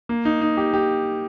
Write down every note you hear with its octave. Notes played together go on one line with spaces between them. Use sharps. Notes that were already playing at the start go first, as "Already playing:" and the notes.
A#3
D#4
D#4
G4
G4